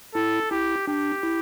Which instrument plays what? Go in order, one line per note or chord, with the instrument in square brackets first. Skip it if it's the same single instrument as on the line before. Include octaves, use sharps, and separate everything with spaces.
[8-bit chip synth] E4 [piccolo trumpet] A4
[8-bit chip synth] E4 [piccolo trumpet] G4
[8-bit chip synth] D4 [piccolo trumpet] G4
[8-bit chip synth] E4